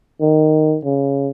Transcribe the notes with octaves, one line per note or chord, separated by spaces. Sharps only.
D#3
C#3